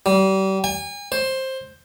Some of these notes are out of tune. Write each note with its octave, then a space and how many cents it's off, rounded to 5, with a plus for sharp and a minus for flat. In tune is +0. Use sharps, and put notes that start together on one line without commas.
G3 -35
G#5 -35
C5 +10